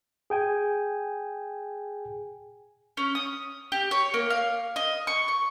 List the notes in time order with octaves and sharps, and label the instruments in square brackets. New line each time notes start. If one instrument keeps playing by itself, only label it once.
[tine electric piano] G#4 G5 G#5
[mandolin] C#4
D#6
G4
C#5
A#3
F5
D#5
C#6
C#6